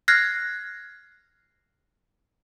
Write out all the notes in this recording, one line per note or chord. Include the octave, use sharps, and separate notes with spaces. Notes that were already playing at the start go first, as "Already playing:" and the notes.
F6 F#6 G#6 A#6 C7